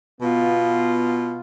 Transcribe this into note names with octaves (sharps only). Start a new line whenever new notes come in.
B2 B3 F4